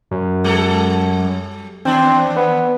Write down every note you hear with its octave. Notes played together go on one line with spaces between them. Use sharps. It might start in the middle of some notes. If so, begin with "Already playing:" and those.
F#2
G3 A4
D#2 C4 D4
B3